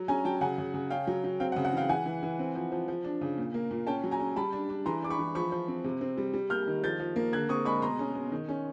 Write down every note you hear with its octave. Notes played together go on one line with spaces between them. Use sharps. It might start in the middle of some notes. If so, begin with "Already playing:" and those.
Already playing: F#3
C#4 G#5 A#5
F#3 G5 A5
C#3 F#5 G#5
C#3
C#3
C#4 F5 G5
F#3
F#3
C4 F5 G5
F#5
C#3
F#5
E3 F5 G5
E3 F#5 G#5
E3
E3
C4
F3
F3
F3
D4
C#3
A#2
A#3
A#2
C#4 G5 A5
F#3
G#5 A#5
C#4
G3 A5 B5
D4
D4
E3 A#5 C6
D4 D6
B5 C#6
E3
F3 B5 C#6
F3
C4
C3
C4
G3
G3
A#3 F6 G6
D#3
F3 G6 A6
F3
A#3
D3 F#6 G#6
C4 C#6 D#6
G#3 B5 C#6
B2 A#5 C6
C#4
B2
D#3
C#4